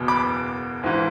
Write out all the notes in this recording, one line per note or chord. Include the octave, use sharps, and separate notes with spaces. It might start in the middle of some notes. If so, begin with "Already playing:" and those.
Already playing: F#1 E2 B2
B5 D6
G#1 G#2 E3